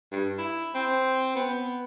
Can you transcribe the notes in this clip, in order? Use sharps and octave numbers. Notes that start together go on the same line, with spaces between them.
G2
E4
C4
B3